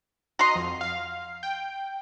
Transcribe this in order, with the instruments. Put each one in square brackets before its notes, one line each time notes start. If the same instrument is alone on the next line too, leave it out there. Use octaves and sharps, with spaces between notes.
[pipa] F#4 C6 [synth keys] D#5 A#5
[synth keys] F2
F5
G5